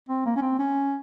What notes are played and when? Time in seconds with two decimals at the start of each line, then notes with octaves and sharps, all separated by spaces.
0.09 C4
0.26 A#3
0.36 C#4
0.42 C4
0.59 C#4